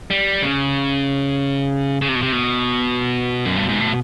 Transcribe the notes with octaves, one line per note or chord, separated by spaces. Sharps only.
G3
C#3
C#3
C3
B2
C3
B2
F#2
G2
G#2
A2